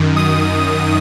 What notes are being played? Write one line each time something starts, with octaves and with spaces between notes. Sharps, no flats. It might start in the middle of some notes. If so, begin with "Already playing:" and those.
Already playing: F#2 D#3
D#6